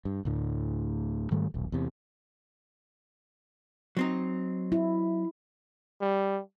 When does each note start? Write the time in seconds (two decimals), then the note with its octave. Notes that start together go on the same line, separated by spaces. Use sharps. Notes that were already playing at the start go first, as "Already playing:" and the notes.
0.05 G2
0.25 D2 A2 D3
1.31 G#2 D#3 G3 A3
1.54 D#1 B1
1.72 E2 C3
3.97 F#3 C4 D#4
4.72 E4
6.01 G3